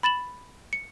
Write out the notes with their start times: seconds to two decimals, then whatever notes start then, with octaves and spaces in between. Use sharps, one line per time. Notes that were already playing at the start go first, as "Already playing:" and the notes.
0.03 B5 A6 E7 F#7
0.73 C#7